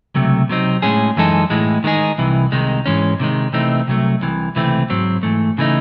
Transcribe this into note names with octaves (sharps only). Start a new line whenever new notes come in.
C#2 C3 F#3 A3
C3 F#3 C4 D#4
A2 G#3 C#4 G#4
F#2 E3 G#3 D#4 A4
A2 E3 G#3
D#3 G#3 D#4 G#4
C2 C3 E3
C2 C3 D#3 G#3 D#4
G#2 E3 G#3 C#4
C3 D#3 G#3
C3 E3 A3 C4 D#4
C2 C3 F#3 A3
C2 C3 E3
C#2 C3 E3 A3 C4
G#2 F#3 C4
G#2 E3 A3
C#3 E3 A3 D#4